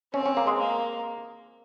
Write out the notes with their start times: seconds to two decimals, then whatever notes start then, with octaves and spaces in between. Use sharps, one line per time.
0.14 C4 C#4
0.26 C#4
0.37 A#3
0.47 G#3
0.59 A#3